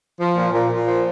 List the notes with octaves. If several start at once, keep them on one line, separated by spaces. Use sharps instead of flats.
F3
A#2
A#2
A#2
F3